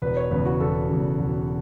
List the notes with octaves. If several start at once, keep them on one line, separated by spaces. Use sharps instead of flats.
E1 B4
C#5
E2 C#3 B4
F#4
E1 A4
E2 C#3
E1